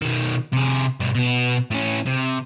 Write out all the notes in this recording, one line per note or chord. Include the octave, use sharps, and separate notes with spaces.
B2 D#3
C3 G#4
G2 B2
B2 B3
A2 C#4
C3